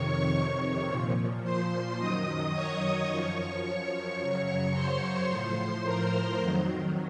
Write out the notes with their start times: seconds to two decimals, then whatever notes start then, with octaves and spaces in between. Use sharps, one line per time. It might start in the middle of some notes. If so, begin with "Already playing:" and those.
Already playing: F2 C3 D#3 C#5 C#6
0.33 C#5 C#6
0.88 A#2 F3
1.43 C5 C6
1.98 F#2 D#3 F#3 D#5 D#6
2.54 C#5 C#6
3.09 F#2 F3 C#5 C#6
3.64 C#5 C#6
4.19 F#2 C#3 F#3 C#5 C#6
4.74 C5 C6
5.29 A2 F3 C5 C6
5.85 A#4 A#5
6.40 F2 D#3 F#3